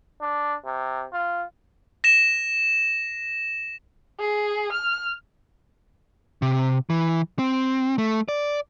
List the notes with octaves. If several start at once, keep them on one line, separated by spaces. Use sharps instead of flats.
D4
C3
F4
A#6 E7
G#4
F6
C3
E3
C4
A3
D5